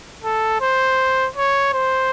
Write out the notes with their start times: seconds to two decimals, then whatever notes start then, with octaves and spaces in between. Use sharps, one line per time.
0.24 A4
0.61 C5
1.36 C#5
1.73 C5